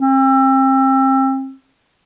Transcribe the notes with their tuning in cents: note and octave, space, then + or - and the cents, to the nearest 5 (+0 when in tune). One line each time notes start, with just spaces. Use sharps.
C4 +35